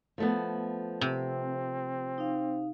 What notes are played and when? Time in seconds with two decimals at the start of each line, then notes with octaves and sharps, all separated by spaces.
0.18 F3 A3 B3
1.01 C3 C4
2.18 D#4 F5